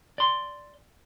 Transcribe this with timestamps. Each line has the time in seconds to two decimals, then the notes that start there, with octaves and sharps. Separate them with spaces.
0.18 D5 C6